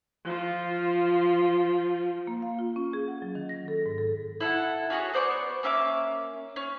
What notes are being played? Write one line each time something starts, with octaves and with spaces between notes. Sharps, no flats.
F3 F4
A#3
F5
F4
C#4
G#4
F#5
F#3
D#3
A#6
A4
G#2
A4
E4 A4 F#5
C#4 F#4 G#4 C#5
B3 C5 D5 C#6
A#3 C#4 E5 D6
C#4